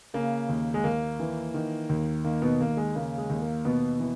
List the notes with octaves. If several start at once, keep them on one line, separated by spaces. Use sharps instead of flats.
C#3 A#3
D#2
G#3
D#2 A#3
E3
D#3
D#2
D#3 A#3
B2 B3
D#2 A#3
G#3
C#3 A#3
G#3
D#2
A#3
D#2 B2 B3
E3